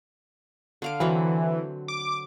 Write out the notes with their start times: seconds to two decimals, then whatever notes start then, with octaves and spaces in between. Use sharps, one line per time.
0.82 D3 F5 D6
1.00 D3 E3 F#3 C4
1.88 D6